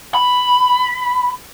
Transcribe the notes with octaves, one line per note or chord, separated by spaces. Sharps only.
B5